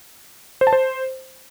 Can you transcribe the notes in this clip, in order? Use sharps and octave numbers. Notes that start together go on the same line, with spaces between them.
C5
A5
C5